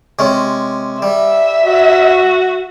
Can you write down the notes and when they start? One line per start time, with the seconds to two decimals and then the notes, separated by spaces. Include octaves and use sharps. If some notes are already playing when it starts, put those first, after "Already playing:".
0.19 C3 G#3 C#4
1.02 G3 E5
1.65 F#4